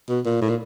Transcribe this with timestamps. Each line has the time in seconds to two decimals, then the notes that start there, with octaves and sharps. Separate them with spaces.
0.09 B2
0.26 A#2
0.42 A2
0.50 A#2